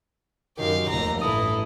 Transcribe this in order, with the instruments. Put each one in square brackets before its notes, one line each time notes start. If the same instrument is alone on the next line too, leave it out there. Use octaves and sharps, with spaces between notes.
[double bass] F#2 D#3 [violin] G4 F5
[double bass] F1 D#2 [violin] A#5
[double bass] A1 G2 [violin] E4 A4 [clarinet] D#6